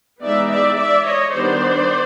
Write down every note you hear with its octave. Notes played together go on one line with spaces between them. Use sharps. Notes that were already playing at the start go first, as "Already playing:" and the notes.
E3 G#3 B3 D#4 D5 E5
D5 E5
D5 E5
C#5 D#5
D#3 G3 B3 D4 C5 D5